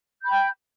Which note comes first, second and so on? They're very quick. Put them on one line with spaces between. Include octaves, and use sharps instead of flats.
G6 B5 G5